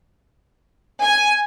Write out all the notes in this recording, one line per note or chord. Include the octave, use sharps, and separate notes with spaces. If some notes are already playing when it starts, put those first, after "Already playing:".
G#5